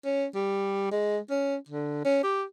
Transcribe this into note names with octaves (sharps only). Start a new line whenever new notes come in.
C#4
G3
G#3
C#4
D3
C#4
G4